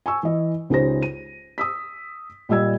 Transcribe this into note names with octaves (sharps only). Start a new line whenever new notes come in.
G#5 C#6 E6
E3 D#5
C#2 C#4 D#4 G4 C5 A#6
D#7
D#6 E6 B6
A#2 G3 D#5 E6 G#6